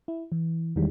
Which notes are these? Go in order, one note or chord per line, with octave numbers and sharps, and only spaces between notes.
E4
E3
E2 D#3 E3 G3 G#3